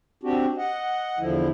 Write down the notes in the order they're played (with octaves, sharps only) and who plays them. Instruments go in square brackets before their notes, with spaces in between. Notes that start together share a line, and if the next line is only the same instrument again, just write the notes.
[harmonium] C4 D4 F#4 G4
D#5 F#5
E2 D3 F3 E4